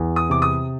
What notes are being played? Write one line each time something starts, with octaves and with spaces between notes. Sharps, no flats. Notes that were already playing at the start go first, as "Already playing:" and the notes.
Already playing: E2
D#6
C3 D6
D#6